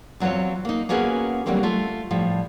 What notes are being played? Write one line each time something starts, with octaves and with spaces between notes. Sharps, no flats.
E2 F#3 C4 F4 C#5
A#3 D#4
A#3 B3 C#4 F#4 G#4 A#4
D3 F#3 G3 A#3 C4 C#4
A3 F4
A2 F3 G3